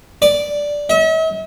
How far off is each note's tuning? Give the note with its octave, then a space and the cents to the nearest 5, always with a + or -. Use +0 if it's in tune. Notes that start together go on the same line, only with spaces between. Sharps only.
D5 -5
E5 -45